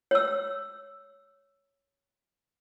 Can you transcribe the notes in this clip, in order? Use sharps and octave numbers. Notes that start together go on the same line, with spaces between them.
C#5 E6